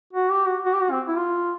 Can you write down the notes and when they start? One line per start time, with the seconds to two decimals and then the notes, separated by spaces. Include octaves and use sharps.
0.13 F#4
0.31 G4
0.47 F#4
0.65 F#4
0.73 G4
0.82 F#4
0.91 C4
1.08 E4
1.17 F4